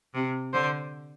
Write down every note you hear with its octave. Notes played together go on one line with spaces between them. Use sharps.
C3
D3 C5